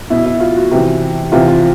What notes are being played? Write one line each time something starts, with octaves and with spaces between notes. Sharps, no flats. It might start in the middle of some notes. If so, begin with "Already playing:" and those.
B2 E4
E4
F4
F#4
C3 E3
C3 E3 F4
F4